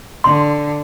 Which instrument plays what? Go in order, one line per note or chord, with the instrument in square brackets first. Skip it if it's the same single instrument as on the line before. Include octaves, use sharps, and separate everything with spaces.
[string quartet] D3 [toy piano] C6